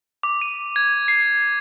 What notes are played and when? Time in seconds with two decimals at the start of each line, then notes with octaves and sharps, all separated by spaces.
0.23 D6
0.42 D#7
0.76 G#6
1.08 C7